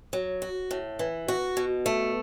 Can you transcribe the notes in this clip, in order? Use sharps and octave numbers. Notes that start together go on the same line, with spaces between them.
F#3
F#4
A2
E3
F#4
B2
A3